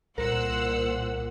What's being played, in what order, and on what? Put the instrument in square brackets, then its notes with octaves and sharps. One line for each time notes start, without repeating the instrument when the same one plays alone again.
[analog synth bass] C2 [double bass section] A#2 [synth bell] A#4 [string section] C5 F#5 E6